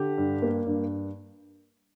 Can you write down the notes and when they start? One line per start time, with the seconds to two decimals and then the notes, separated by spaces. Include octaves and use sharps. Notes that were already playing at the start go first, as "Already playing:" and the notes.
Already playing: D3 G4
0.18 G2
0.42 A#3
0.66 G2